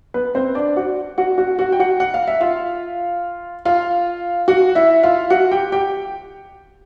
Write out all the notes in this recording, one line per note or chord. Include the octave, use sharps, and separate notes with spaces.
B3 B4
C4 C5
D4 D5
F#4 F#5
F#4 F#5
F#4 F#5
F#4 F#5
G5
F#4 F#5
F#5
F5
E5
F4 F5
F4 F5
F#4 F#5
E4 E5
F4 F5
F#4 F#5
G4 G5
G4 G5